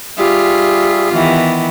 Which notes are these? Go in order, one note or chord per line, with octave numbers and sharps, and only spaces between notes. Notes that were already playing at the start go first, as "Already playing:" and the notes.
G3 F4 G4 G#4 E5
D#3 E3 B3